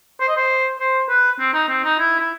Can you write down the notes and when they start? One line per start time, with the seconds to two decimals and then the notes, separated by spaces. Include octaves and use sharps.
0.20 C5
0.28 D#5
0.36 C5
0.80 C5
1.09 B4
1.39 C4
1.54 D#4
1.69 C4
1.84 D#4
1.99 E4
2.19 E4